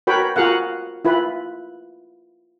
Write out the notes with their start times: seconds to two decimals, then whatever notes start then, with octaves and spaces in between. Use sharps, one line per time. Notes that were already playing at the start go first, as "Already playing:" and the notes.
0.07 F#4 A#4 B4 C#5 G5 B5
0.36 F4 F#4 G#4 A#4 F5 F#5
1.05 E4 F4 B4